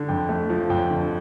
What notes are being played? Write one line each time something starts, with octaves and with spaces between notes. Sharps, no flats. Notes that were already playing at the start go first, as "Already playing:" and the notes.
Already playing: D3
F2 G5
A3
F3
F2 G5
D3